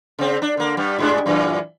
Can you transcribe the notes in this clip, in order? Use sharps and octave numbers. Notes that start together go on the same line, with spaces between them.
C#3 C4
D4
D3 A#3
G2 G3
G#2 G#3 D4
F#2 A#2 E3